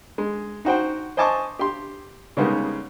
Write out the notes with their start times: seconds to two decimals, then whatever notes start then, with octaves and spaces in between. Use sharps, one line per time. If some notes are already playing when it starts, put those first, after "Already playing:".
0.18 G#3
0.65 D#4 F#4 C5 G5
1.17 C5 D#5 G#5 A5 C#6 D6
1.59 G4 C6
2.37 C#3 G3 G#3 B3 D#4 A#4